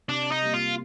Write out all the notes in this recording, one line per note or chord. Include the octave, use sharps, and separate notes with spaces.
C3 D4
D#4
G3 A#3
F4